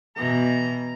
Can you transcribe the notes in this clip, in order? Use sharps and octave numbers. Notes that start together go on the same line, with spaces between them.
B2 E3 A#5